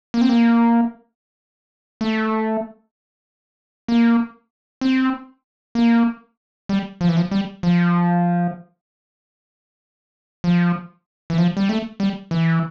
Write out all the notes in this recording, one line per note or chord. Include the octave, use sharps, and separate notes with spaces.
A#3
C4
A#3
A3
A#3
C4
A#3
G3
F3
E3
F3
G3
F3
F3
E3
F3
G3
A3
G3
E3